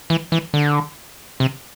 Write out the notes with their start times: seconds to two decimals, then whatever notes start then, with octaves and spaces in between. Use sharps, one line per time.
0.10 E3
0.32 E3
0.54 D3
1.40 C3